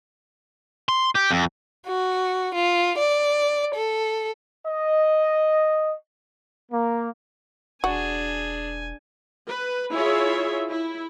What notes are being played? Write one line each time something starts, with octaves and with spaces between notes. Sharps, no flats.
C6
G4
F2
F#4
F4
D5
A4
D#5
A#3
E1 D4 F#4 G#4 G#5
B4
E4 F4 G#4 C#5 E5
E4